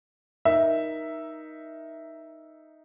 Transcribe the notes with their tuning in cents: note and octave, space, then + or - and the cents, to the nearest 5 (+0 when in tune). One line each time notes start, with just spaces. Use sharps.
D#4 +0 A#4 +20 E5 +0